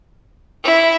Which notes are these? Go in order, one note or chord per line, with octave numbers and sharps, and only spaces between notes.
E4